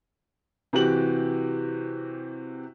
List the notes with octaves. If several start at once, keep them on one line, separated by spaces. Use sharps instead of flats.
C3 E3 F#4 G4 F#7